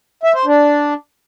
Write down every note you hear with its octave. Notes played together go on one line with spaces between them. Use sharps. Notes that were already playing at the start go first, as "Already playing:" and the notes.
E5
C5
D4